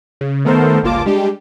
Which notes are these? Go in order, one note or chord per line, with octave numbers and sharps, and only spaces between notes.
C#3
D#3 A3 B3 A4 A#4 C5
G1 C#2 A#3 F4 A5 D6
G3 G#3 D4 G4